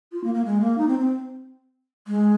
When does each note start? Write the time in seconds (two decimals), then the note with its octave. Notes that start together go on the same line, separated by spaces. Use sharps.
0.12 F4
0.24 A#3
0.34 A#3
0.45 G#3
0.61 A#3
0.78 D#4
0.88 C4
0.99 C4
2.08 G#3